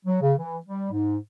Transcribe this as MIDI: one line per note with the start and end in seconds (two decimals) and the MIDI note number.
0.05 0.17 54
0.21 0.33 49
0.38 0.57 52
0.66 0.89 55
0.91 1.16 44